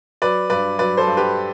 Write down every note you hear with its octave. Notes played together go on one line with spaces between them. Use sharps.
F#3 B4 D5
G2 B4 D5
F#3 B4 D5
A4 C5
G2
G4 B4